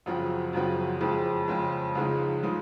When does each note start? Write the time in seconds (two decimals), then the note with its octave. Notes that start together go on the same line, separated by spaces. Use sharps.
0.06 F#2 C#3 F3 C4 F#4
0.53 F#2 C#3 F3 C4 F#4
1.01 F2 C#3 G#3 C4
1.48 F2 C#3 G#3 C4
1.95 C#2 C#3 F3 G#3 D#4
2.43 C#3 F3 G#3 D#4